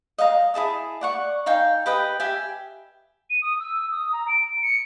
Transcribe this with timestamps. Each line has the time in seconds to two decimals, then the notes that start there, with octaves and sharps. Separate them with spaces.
0.18 D#5 F5 F#5 A#5
0.54 E4 G#4 A5 D#6
1.01 D5 F#5 C#6
1.46 D#4 F5 G5 G#5
1.86 G4 B4 D#5 G5
2.20 G4 E5 G5 G#5
3.30 D#7
3.42 D#6
3.59 E6
3.91 D#6
4.12 A#5
4.28 D7
4.63 C#7